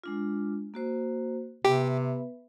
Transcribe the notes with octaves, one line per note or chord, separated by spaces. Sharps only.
G#3 D4 F4
A#3 F#4 C5
C3 B3 G4 B4 E5